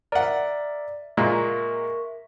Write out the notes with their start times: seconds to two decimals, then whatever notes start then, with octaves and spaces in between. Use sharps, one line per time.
0.12 A#4 D5 E5 F#5
1.17 A#2 G#3 A#3 A#4 E5 C#6 B6